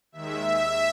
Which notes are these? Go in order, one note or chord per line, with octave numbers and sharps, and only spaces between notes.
D#2 D#3 G#3 E5